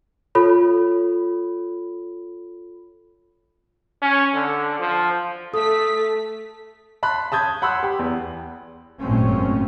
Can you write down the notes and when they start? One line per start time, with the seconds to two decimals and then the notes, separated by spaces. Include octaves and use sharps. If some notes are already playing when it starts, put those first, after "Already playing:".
0.35 F4 A4 C#5 B5
4.02 C#4
4.35 D3
4.80 F3
5.54 A3 A4 D#6 B6
7.03 A5 B5 C6 F#6
7.32 A5 D#6 G6 G#6
7.62 F#5 B5 C6 E6 F#6
7.83 G4
7.99 E2
9.00 G#1 F#2 A#2 A3 C4 C#4